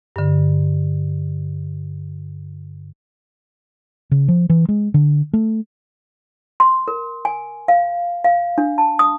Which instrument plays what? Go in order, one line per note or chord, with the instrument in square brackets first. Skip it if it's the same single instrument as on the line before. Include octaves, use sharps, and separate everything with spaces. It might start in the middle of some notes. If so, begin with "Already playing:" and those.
[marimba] G2 D3
[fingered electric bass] C#3
F3
E3
G#3
D3
A3
[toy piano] C6
A#4
G#5
F5
F5
D4
A5
D#6